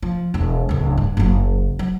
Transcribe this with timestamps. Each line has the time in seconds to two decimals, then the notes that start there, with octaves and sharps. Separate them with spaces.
0.02 F3
0.34 E1 D2
0.69 D1 C#2
0.97 G2
1.17 F#1 F#3
1.79 F#3